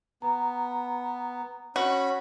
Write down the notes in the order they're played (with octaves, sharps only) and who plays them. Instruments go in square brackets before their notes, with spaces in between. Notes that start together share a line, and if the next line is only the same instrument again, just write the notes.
[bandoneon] B3 [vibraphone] A#5
[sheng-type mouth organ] C#4 B5 [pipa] F#4